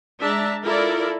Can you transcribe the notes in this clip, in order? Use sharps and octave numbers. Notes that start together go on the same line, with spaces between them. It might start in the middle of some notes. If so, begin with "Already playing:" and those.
G#3 D4 E5 A5 A#5
E4 F4 A4 A#4 D5